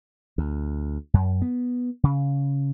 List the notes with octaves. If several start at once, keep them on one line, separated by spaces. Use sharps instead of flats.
D2
F#2
B3
C#3